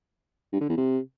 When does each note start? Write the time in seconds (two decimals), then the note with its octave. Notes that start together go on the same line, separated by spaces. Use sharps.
0.52 G2
0.61 D3
0.69 E2
0.77 C3